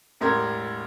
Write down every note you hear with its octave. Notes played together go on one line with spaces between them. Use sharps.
E1 A2 G4 A#4 C6 G#6